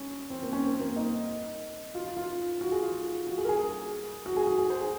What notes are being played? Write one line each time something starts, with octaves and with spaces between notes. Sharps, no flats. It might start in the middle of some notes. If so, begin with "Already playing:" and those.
Already playing: C#4
C4
A#3
C#4
C4
A#3
D#4
F4
F4
F4
F#4
G#4
F4
F#4
G#4
A#4
G#4
F#4
G#4
F#4
G#4
C5
G#4